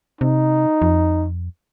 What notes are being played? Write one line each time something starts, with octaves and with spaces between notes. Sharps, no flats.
C3 D#4
F2